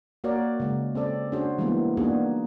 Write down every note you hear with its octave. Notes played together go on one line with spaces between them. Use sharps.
A#3 F#4 A#4 C#5 D5
C#3 G#3
C4 C#4 A4 D5
C#4 D4 F#4 G#4 C5
E3 G3 G#3 A#3 B3 E4
A#3 B3 D4 D#4 F#4 G#4